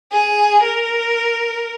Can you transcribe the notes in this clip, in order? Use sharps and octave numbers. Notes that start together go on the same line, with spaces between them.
G#4
A#4